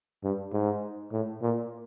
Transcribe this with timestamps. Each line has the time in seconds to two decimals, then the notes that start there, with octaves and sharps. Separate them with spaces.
0.23 G2
0.52 G#2
1.12 A2
1.42 A#2